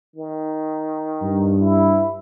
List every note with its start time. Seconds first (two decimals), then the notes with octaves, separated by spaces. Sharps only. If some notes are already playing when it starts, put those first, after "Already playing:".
0.16 D#3
1.22 G2
1.61 E4